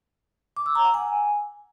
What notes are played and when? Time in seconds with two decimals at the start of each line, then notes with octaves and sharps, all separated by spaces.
0.56 D6
0.66 E6
0.75 A#5
0.85 F#5
0.94 G#5